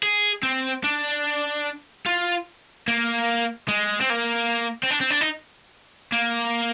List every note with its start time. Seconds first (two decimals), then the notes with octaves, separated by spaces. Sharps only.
0.03 G#4
0.43 C4
0.84 D4
2.06 F4
2.88 A#3
3.68 G#3
4.01 C4
4.10 A#3
4.83 C4
4.90 D4
5.00 C4
5.10 D4
5.21 D#4
6.13 A#3